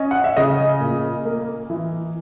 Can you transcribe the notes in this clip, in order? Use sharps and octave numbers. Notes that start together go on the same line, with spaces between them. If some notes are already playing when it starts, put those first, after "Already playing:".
Already playing: C#4 D#5
F#5
E5
C#3 D#5
A#2
A#3
E3